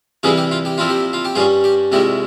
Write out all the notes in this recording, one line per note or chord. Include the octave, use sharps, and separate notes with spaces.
C3 E3 G3 A#3 E4 F4 G#4
G4
F4
G4
A#2 F3 C4 E4 F4
G4
F4
G4
G2 G3 C#4 F4 G#4
G4
C2 A#2 G#3 E4 G4